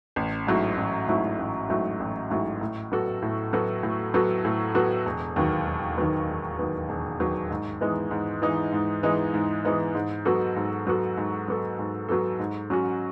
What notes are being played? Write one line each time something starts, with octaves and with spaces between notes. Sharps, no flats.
A1
G#2 F#3 A3 E4
A1
G#2 F#3 A3 E4
A1
G#2 F#3 A3 E4
A1
G#2 F#3 A3 E4
A2
F#3 B3 F#4 A4
A2
F#3 B3 F#4 A4
A2
F#3 B3 F#4 A4
A2
F#3 B3 F#4 A4
E1
D#2 D#3 F#3 B3
E1
D#2 D#3 F#3 B3
E1
D#2 D#3 F#3 B3
E1
D#2 D#3 F#3 B3
G#2
E3 G#3 B3 D#4
G#2
E3 G#3 B3 D#4
G#2
E3 G#3 B3 D#4
G#2
E3 G#3 B3 D#4
G#2
F#3 B3 F#4 A4
G#2
F#3 B3 F#4 A4
G#2
F#3 B3 F#4 A4
G#2
F#3 B3 F#4 A4
G#2
F#3 C#4 F#4